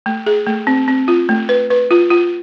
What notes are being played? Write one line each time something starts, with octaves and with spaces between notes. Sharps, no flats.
A3
G#4
A3
C4
C4
F4
A3
B4
B4
F4
F4